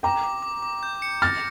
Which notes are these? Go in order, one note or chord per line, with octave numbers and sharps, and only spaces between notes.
G5 A#5 D6
D6
D6
D6
G6
C#7
F6 A6 A#6